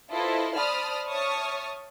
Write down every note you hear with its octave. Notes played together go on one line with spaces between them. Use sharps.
E4 F4 A4 B4 C5 D#5
C5 D5 A5 B5 D#6 F6
C#5 E5 A5 C#6 D#6 F6